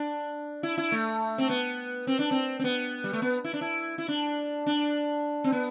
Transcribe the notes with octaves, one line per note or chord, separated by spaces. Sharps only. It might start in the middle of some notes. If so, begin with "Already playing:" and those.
Already playing: D4
E4
E4
A3
C4
B3
C4
D4
C4
C4
B3
G3
A3
B3
E4
D4
E4
E4
D4
D4
C4
B3